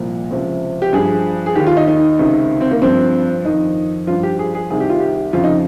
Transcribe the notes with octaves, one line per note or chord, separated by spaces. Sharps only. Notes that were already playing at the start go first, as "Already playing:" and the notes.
Already playing: C2 A#2 F3
C#2 C3 F3
G4
G2 F3 G#4
G#4
D#2 D#3 G4
F4
D#4
D#4
C#2 C3 D#3
C4
A#3
G2 F3 C4
F2 D#3 D#4
G2 F3 F4
G4
G#4
G#4
C2 C3 D#3 G#4
G4
F4
G4
F2 C#3 F3 F4
D#4